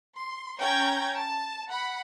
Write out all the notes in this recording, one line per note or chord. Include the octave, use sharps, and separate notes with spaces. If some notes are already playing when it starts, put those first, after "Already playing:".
C6
C#4 G5 A#5 G6 G#6
A5
F#5 B5